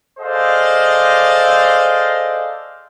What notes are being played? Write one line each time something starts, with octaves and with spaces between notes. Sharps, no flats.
G#4 A4 C5 D5 D#5 F5